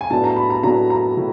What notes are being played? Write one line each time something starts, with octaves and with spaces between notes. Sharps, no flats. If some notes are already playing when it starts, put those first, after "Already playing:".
G#5
A2 F#3 B3 D4 A5
A#5
B5
A#5
A2 F#3 B3 D4 A#5
A#5
A2 F#3